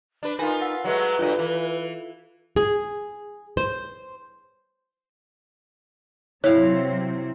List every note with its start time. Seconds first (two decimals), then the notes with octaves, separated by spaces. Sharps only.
0.23 D4 B4
0.39 D#4 F4 A#4 B4 G#5 A#6
0.62 F#5 E6
0.85 F#3 G#3 A3 B4
1.19 G2 B2 F#3 F4 A4
1.39 E3
2.56 G#4
3.57 C5
6.44 C3 F#3 C4 E4 C#5 F5